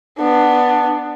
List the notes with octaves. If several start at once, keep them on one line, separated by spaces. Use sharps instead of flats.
B3 D4